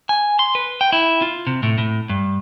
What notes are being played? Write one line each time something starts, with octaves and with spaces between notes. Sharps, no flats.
G#5
C6
B4
G5
E4
F4
C3
A2
A2
G2